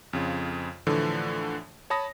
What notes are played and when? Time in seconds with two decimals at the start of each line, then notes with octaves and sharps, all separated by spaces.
0.13 F2 C#3 F4
0.87 A2 D3 E3 F3 A3
1.90 C#5 A5 B5 D#6 A#6